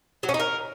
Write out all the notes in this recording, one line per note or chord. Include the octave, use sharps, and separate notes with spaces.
F#3
C#4
D#4
A#4